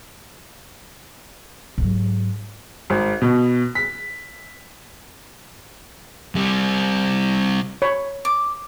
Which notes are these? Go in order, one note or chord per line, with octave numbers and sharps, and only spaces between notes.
G#2 F#3
G#1
B2
B6
C3 G3
C#5 B5
D6